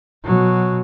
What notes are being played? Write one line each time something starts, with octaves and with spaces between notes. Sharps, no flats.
B2 F#3